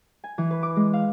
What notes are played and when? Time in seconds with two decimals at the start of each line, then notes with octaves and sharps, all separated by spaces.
0.24 G#5
0.38 E3
0.51 B4
0.63 D6
0.76 G#3
0.93 F5